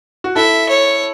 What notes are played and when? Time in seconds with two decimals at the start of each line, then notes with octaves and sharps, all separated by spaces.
0.24 F#4
0.35 E4 A4 E5
0.69 C#5